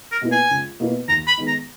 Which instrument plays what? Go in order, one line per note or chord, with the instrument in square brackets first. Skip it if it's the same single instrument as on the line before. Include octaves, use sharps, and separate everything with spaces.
[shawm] A#4
[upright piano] B2 A#3 E4 B4
[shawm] G#5
[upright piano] C#2
B2 A#3 E4 B4
[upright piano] D#2 [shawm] A#5
[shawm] B5
[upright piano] D#3 G#3 B3 D#4
[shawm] A#5